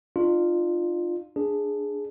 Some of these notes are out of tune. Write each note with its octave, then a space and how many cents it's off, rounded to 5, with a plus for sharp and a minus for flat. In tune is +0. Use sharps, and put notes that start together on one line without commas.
D4 +45 F4 +0
D4 +0 G#4 +0